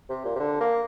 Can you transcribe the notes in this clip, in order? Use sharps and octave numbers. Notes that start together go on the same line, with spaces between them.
C3
A#2
C3
D3
A#3